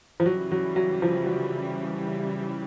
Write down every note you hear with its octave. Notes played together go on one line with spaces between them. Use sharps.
F3
C#3 E3 F#3 G3
F#3
F#3
F3
F#3